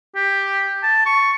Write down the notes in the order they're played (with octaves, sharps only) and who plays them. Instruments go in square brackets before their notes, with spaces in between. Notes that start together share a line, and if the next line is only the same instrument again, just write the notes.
[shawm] G4
A5
C#6